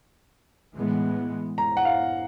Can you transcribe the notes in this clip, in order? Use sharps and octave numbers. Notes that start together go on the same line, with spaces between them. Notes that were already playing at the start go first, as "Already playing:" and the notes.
A2 E3 G#3 B3
A#5
F#5
F5